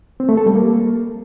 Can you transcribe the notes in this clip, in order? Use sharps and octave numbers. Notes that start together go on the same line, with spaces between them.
C4
A3
A4
G3
A#3